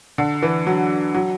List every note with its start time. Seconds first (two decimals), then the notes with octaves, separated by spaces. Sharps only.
0.18 D3
0.42 E3
0.67 F#3
1.15 F#3